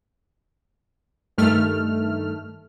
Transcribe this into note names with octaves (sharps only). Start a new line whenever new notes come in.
G2 D#3 A3 F6